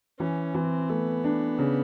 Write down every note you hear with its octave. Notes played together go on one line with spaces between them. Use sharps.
E3 C#4
E3 C4
A3 B3
D4
C#3